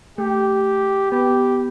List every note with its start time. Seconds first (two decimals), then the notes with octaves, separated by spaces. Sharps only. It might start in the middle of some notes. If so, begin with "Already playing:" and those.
0.18 A3 G4
1.11 B3 G4